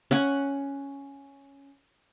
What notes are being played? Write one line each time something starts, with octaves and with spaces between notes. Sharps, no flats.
C#4 F#5 G#5